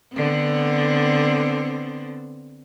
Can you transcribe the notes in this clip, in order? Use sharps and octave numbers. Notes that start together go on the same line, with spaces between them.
D3 B3 C4